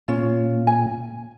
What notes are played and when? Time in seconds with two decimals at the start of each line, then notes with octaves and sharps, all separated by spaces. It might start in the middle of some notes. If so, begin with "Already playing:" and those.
0.08 A#2 C#4 F4
0.67 G#5